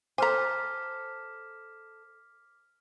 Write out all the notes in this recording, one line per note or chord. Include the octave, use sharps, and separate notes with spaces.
A4 C5 G#5 A#5 D6 F6 B6